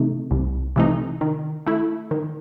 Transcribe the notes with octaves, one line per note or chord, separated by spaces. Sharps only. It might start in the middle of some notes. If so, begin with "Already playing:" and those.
Already playing: C3 E3 A3 D#4
C2
C3 E3 A3 D#4
D#3
A3 E4
D#3